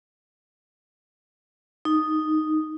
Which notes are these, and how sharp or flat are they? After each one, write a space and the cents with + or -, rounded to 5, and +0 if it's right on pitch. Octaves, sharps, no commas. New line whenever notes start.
D#4 -5